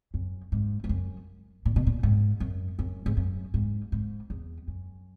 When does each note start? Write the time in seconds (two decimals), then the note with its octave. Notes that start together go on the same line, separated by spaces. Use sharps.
0.14 F#2
0.52 G#2
0.84 G#2
0.89 F#2
1.65 A#2
1.76 B2
1.87 A#2
2.03 G#2
2.40 F#2
2.79 F#2
3.06 G#2
3.17 F#2
3.54 G#2
3.92 G#2
4.30 E2
4.68 F#2